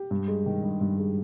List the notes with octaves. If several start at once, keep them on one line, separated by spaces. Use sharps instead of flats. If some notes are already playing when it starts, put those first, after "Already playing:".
Already playing: G4
G2
G#3
D#3
G2
G2
G#3